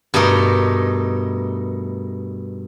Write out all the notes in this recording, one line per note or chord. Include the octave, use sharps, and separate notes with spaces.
G2 B2 A3 D#4 A#4